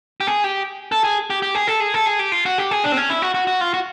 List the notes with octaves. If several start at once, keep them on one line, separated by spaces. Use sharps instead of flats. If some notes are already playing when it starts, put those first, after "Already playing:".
G4
G#4
G4
A4
G#4
G4
G4
G#4
A4
G#4
A4
G#4
G4
F4
F#4
G4
G#4
D4
C4
C#4
E4
F#4
F#4
F#4
F4
F#4